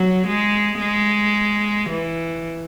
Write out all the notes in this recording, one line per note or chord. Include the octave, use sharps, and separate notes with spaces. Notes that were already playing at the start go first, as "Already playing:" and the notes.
Already playing: F#3
G#3
G#3
E3